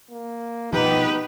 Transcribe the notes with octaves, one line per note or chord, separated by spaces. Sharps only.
A#3
B2 F3 B3 D#4 G4 B4